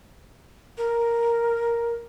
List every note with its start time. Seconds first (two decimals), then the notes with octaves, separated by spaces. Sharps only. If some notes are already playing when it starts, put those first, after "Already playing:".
0.78 A#4